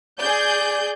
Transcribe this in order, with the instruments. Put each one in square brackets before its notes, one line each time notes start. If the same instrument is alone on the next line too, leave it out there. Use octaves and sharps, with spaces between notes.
[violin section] G#4 G6 [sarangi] D5